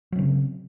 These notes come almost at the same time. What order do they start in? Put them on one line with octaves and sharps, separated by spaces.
F#3 C4 C#3